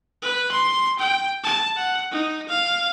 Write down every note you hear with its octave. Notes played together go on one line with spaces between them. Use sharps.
B4
C6
G5
A5
F#5
D#4
F5